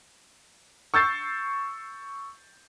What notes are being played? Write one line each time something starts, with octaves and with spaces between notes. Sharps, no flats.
C#6 E6 G6 A6 C7